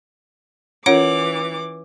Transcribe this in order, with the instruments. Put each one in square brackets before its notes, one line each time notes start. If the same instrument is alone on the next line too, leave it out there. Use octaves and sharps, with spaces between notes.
[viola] E3 D6 [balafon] C#4 F4 A#4 [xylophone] C#5 F#5 D7